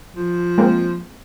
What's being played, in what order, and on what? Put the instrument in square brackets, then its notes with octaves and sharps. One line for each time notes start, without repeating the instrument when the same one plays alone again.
[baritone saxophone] F3
[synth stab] G#3 A#3 C4